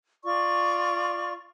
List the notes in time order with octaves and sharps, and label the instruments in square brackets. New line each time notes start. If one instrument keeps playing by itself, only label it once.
[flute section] F4 D5 C#6